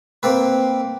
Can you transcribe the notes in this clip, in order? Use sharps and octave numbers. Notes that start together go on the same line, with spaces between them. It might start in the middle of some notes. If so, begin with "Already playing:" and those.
A#3 C4 B4